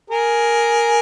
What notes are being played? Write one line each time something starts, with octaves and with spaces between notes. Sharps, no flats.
G#4 A#4